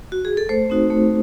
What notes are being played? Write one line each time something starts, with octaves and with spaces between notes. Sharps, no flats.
F#4
G#4
A4
A3 C5
C4 D#4 F#4
A3